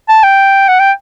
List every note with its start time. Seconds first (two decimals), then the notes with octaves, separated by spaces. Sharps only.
0.09 A5
0.23 G5
0.68 F#5
0.80 G5